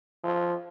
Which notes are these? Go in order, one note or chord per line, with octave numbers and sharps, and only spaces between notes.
F3